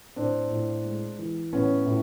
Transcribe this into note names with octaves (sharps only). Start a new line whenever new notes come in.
A2 C4 D4
A2
G#3
E3
A2 B3 C#4
A2